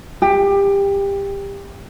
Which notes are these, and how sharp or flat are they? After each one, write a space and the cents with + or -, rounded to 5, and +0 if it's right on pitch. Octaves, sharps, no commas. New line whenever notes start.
G4 +20